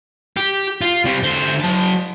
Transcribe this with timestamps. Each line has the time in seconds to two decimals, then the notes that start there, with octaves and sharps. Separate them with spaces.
0.37 G4
0.81 F4
1.05 C3 G3
1.23 D3 C5
1.60 F#3 A5